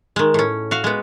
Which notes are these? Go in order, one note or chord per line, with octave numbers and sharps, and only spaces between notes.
D#3 G#3
A2 C#4
F#4 F5
G#3 B3